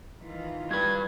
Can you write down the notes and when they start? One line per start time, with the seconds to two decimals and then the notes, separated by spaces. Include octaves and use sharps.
0.23 D#3 E3 F4
0.71 G2 B4 G#6